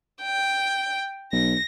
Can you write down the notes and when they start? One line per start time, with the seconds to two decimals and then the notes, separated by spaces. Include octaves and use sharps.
0.23 G5
1.32 B1 A#6